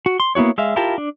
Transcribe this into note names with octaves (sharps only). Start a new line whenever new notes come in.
F#4
C6
A#3 B3 E4 F#4 C#5
G#3 E5 F5
E4 F4 G4 A#4 A5
D4